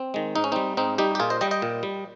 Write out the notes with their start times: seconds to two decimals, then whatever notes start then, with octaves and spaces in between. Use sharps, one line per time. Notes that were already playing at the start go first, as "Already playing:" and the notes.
Already playing: C4
0.14 D#3 G#3
0.35 G#2 D#4
0.44 C#4
0.52 G3 C4 D#4
0.77 G#2 C4 D#4
0.98 G3 D#4 G4
1.15 G4
1.20 A#2 F4 G#4
1.30 C5 D#5
1.41 G3 D#5 G5
1.51 D#5 G5
1.62 A#2
1.83 G3